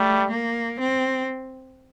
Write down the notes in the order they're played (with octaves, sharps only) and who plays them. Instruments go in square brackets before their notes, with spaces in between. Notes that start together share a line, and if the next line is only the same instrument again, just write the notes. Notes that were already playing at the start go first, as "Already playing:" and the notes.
Already playing: [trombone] G3 [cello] A3
[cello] A#3
C4